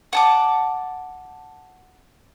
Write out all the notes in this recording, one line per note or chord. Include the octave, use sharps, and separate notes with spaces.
F#5 A5 D6